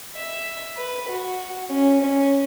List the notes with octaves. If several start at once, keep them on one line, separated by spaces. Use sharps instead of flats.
E5
B4
F#4
C#4
C#4